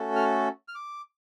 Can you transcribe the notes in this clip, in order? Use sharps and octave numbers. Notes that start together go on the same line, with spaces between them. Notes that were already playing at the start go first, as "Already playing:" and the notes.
Already playing: A3 C#4 F#4 A4
F6
F6
D6